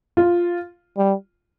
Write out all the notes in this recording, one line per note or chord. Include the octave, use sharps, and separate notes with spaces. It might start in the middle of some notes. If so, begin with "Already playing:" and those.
F4
G3